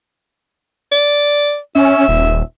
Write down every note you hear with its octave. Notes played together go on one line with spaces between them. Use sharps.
D5
C#4 E5
D#1